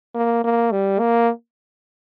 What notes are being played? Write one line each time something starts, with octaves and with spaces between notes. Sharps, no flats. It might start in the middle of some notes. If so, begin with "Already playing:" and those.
A#3
A#3
G3
A#3